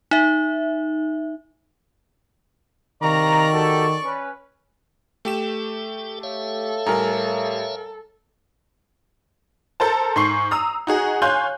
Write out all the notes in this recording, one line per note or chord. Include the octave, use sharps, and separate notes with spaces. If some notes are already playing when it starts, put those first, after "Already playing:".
D#4 E5
C3 D#3 D5 F5 A#5 C#6
F#4 G4 A4
C#4 B4
A3 G4 A4 G5 E7
A4 C#5 E5 F5
A2 G3 A#4 G#5 A#5
A4 A#4 C5 A5
G#2 C6 C#6 C7
A#5 D#6 E6
D#4 F#4 G#4
C#5 F5 G#5 C6 F#6 G6